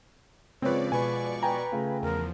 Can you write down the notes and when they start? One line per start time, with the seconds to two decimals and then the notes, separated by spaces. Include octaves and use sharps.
0.62 C#3 F3 G#3 C4 B4 C#5 D5
0.92 B2 B4 D5 G#5 C#6
1.43 B4 G5 G#5 A#5
1.72 C#3 A3 F4
2.03 E2 F3 A#4